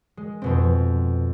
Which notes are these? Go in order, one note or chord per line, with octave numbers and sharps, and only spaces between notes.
G#3
F2 B2 C4